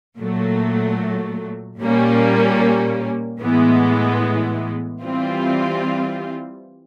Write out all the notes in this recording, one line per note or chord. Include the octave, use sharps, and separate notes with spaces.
A#2 F#3 A3
A#2 G3 A#3 C#4
A2 E3 G#3 B3
E3 G3 C4 F4